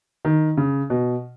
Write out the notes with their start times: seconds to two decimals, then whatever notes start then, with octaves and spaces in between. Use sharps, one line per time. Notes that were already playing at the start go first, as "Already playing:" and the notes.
0.25 D#3
0.57 C#3
0.90 B2